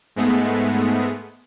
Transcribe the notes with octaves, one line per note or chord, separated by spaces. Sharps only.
G#2 G#3 A3 B3